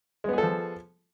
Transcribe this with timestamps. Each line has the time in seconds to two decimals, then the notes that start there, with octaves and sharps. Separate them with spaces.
0.24 G#3
0.29 B3
0.33 G#4
0.38 A4
0.43 F3